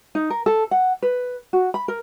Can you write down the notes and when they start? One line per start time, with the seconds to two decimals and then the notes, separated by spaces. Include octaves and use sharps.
0.15 D#4
0.30 A#4
0.46 A4
0.71 F#5
1.02 B4
1.53 F#4
1.74 B5
1.88 A#4